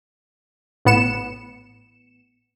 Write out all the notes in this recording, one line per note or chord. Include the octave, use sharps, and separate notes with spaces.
A1 A2 B3 C#7 E7